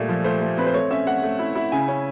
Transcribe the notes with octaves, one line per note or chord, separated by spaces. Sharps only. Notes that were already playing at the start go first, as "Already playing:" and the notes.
Already playing: A#2 G3 A3
F3
A3 C5
A3
C4 B4
C5
A3 C#5
C#4 E5
A3 F#5
A3
E4
E4
C#3 G#5
C#4